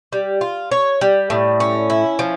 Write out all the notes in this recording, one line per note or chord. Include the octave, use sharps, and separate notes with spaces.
G3
F4
C#5
G3
A2
C#4
E4
F3